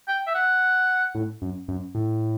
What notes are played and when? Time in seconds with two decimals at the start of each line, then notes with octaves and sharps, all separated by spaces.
0.08 G5
0.27 E5
0.35 F#5
1.15 A2
1.42 F#2
1.68 F#2
1.95 A2